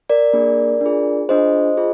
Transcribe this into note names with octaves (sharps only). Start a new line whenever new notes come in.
A#4 D5
A#3 D4 G#4
D4 F4 G#4
D4 F4 G#4 C5 D#5
F4 G#4